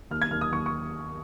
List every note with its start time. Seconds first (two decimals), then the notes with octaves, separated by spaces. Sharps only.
0.11 D#2 F6
0.22 G#6
0.31 D#2 F6
0.41 D#6
0.52 D#2 C#6
0.66 C#6